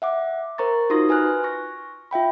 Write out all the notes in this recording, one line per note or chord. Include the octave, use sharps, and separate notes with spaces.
E5 F#5 D6
A#4 C5 A#5 C#6 A6
D#4 F4 F#4 C6 D#6 A#6
B4 G#5 F6 F#6
C#6 A#6
F4 E5 G5 B5